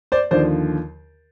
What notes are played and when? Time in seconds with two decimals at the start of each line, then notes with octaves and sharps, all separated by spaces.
0.12 C5 D5
0.31 D#2 D3 F3 C5 D5